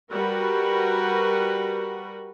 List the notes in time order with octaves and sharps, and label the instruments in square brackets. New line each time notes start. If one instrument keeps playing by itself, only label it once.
[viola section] G3 F#4 A#4 B4